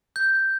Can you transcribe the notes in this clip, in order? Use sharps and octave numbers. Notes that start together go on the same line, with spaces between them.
G6